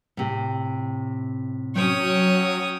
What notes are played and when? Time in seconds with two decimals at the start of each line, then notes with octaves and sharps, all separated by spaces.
0.17 A2 C3
1.76 F#3 C#4 C#5 G5 D#6